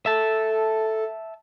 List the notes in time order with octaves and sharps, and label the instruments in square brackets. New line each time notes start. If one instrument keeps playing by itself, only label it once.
[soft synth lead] A4 [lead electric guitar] E5 A5